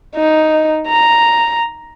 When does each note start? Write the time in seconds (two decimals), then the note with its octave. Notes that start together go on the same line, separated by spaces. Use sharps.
0.15 D#4
0.88 A#5